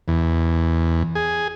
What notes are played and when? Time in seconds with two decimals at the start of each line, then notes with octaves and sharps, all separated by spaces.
0.08 E2
1.15 G#4